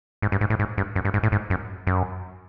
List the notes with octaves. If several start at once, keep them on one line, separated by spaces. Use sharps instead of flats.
G#2
G2
G#2
A2
G#2
G2
F#2
G2
G#2
A2
G#2
F#2
F#2